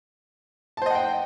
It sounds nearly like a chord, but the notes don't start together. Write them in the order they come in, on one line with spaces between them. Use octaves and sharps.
A5 C5 D#5 F#5 G5